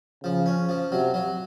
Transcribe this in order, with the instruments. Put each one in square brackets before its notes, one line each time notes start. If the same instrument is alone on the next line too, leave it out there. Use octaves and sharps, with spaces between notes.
[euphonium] C#3 [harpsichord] F3
[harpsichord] C#4
F3
[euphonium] C3 [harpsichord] F#3
[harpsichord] F#3